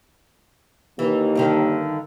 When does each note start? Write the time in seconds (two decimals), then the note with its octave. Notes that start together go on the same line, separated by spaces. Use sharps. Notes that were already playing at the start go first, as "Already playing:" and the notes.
0.99 D#2 E3
1.35 G2 D3 D#3